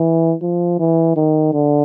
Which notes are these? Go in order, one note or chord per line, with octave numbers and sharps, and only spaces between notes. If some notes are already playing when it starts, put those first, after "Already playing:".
Already playing: E3
F3
E3
D#3
D3